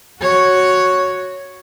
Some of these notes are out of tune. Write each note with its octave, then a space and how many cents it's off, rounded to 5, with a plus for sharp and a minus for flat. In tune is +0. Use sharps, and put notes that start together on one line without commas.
F#4 +0 C#5 +0